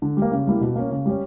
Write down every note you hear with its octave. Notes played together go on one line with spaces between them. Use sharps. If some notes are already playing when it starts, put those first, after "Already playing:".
D3
G3
A#3
C#3
G3 A#3 E4
B2
A#3 C#4
C#3
G3 C#4